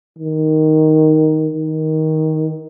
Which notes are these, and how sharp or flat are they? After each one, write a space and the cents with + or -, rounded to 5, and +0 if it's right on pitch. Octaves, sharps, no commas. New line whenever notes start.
D#3 +5
D#3 +15